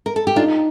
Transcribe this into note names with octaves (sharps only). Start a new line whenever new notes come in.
A#4
A4
G4
D4 D#4 F4